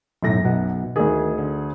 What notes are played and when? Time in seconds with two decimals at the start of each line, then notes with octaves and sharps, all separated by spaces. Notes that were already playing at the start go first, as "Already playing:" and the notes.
0.23 B1 F#2 A2 A#6
0.45 B1 B2 F#5
0.96 D2 D#3 G#4
1.38 D3